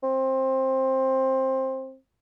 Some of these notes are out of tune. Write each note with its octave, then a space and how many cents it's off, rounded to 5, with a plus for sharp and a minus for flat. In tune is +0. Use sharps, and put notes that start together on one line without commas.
C4 +15